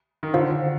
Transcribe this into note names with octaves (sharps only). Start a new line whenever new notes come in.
D#3
D3 F4 C5 F5